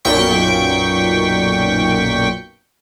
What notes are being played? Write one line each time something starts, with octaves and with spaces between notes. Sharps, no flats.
B1 F#2 A#2 G5 C#6 B6